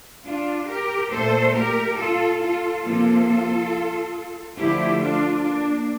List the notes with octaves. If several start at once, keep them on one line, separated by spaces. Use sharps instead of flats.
D4 F4
G4 A#4
A#2 A3 A4 C5
G4 A#4
F4 A4
F4 A4
C3 F3 A#3 F4 A4
D3 F3 A3 E4 G4
D4 F4
A#3 D4